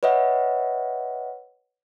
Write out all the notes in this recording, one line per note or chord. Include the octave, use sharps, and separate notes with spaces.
B4 C#5 D#5 E5 F#5